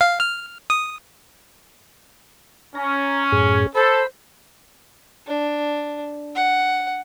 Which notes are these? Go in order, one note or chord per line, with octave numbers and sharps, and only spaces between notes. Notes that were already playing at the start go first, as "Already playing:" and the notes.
F5
F6
D#6
C#4 A#5
F#2 A2 G#4
A4 C5 B5
D4
F#5